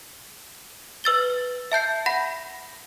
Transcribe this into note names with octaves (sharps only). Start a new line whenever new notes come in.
B4 E6 A6 G7
E5 A5 G6 C7
F#5 B5 A#6